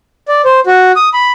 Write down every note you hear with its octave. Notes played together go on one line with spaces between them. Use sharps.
D5
C5
F#4
D#6
B5